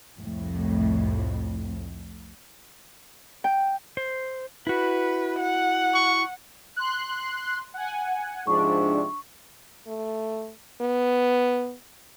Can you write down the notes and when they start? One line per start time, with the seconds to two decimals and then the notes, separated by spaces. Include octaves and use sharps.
0.19 C2 F2 A2
3.44 G5
3.97 C5
4.67 E4 F#4 B4
5.39 F#5
5.94 C#6
6.76 C6 F#6
7.74 F#5 G#5
8.47 G#2 C3 F3 D4 C#6
9.87 A3
10.81 B3